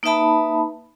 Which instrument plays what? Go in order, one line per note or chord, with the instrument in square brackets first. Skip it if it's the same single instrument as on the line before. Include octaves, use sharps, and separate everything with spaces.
[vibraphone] A#3 D#4 B4 E5 A5 B5